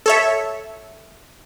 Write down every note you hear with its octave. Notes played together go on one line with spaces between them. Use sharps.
A4 C#5 E5